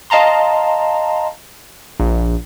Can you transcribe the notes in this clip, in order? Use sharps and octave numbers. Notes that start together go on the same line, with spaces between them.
D#5 F5 A5 A#5 C6
A#1